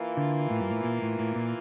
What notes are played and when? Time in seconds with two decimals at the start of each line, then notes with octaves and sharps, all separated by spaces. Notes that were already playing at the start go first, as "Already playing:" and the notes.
Already playing: E3 A#3 F4
0.17 D3
0.50 A2
0.60 G2
0.70 A2
0.84 A#2
1.02 A2
1.19 A2
1.36 A#2